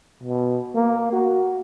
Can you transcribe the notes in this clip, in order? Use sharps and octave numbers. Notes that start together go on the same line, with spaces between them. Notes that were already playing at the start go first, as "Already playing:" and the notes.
B2
A#3
F#4